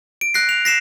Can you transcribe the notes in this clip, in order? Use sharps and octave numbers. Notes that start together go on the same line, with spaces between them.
D7
F#6 A#6 C7
F7
A#6 C7 E7